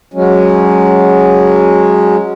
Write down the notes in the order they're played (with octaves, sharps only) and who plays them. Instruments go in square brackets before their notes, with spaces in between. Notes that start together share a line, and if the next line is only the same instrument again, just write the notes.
[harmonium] F#3 G#3 C#4